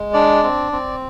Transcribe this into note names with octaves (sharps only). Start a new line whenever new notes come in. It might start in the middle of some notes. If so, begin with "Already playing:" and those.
Already playing: G#3
D4 D5
C4
C4